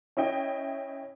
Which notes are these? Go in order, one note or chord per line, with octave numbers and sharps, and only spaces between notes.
C#4 E4 D#5 G5